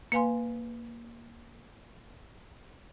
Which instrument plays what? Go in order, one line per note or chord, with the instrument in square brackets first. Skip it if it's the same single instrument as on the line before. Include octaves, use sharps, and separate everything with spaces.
[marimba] A#3 B4 F5 G#5 C6